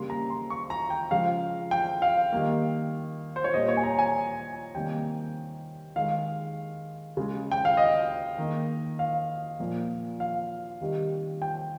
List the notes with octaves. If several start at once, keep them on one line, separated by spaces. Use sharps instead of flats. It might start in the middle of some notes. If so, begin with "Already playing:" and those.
Already playing: C#3 G3 A#3 C6
A#5
C6
C#6
A#5
G5
C#3 F3 G#3 F5
G5
F5
D#3 G3 A#3
C5
C#5
A#2 G3 A#3 D#5
C#5
G#5
A#5
G#5
C3 D#3 G3 A#3 G5
D#3 G#3 F5
C#3 G#3
G5
F5
D#5
D#3 A#3
F5
A#2 F3 A#3
F5
C3 D#3 G3
G5